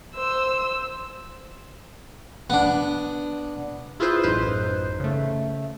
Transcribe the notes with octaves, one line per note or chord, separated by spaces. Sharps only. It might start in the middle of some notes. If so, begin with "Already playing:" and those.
C5 E6
B3 D4
E4 F4 G#4 B4 C5
A1 F#2 D#4 B4 C5
C#3 A3